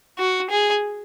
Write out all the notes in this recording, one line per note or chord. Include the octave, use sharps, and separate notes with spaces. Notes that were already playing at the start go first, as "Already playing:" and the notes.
F#4
G#4